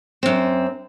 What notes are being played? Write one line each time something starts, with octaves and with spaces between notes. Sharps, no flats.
F#2 C4